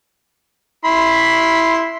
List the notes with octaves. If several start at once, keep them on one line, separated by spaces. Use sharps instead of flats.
E4 B5 C6